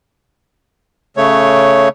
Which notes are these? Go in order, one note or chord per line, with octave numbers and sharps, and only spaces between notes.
C#3 A3 C#5